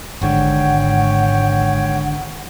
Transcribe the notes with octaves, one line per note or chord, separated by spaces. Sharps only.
G#1 G#2 D3 C#5 F#5 G5